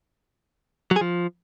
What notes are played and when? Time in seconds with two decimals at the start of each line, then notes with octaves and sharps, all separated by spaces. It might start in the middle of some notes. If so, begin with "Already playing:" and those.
0.91 F#3
0.96 G#4
1.01 F3